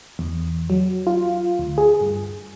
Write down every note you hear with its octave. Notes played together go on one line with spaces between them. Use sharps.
E2
F#3
F4
D2
G#4
G2